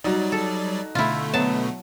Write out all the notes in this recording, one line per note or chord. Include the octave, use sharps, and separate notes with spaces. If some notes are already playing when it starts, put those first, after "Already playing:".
F#3 G3 D#4 F#4 D5
A4
B2 D3 A3 E4 F4
F#3 B3 A5